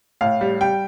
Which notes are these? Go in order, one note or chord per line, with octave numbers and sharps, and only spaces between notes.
A2 F5
G3
G3 G5